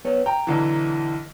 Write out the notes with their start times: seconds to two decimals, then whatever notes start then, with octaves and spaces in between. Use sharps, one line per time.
0.05 B3 C#5
0.26 G5 A#5
0.47 B1 D3 E3